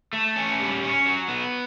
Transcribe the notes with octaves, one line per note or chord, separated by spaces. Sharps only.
A3
C#4
G3
C#4
F#3
B3